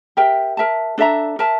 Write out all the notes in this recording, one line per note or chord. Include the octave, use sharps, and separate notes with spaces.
G4 A#4 E5 G5
A#4 E5 A5
D4 A4 E5 A#5
A#4 E5 A5